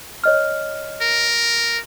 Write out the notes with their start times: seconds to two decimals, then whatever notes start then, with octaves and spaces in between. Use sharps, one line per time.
0.24 C#5 D#5 F6
1.01 A#4